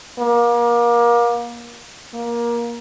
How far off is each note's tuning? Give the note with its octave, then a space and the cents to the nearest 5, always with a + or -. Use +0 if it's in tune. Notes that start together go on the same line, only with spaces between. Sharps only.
A#3 +30
A#3 +20